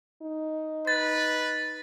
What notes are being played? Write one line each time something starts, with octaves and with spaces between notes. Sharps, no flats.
D#4
B4 A6